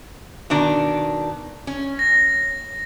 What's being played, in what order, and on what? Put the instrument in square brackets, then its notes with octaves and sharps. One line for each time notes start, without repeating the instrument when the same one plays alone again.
[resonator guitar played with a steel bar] B2 D#3 D4
C#4
[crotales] A#6